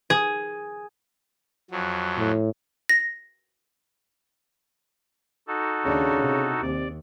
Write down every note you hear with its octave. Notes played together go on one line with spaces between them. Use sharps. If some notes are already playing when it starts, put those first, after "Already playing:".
G#4
F2 F#3
A2
A#6
D#4 F#4 A4
D#2 C#3 D4
C3
D#2 C3 D5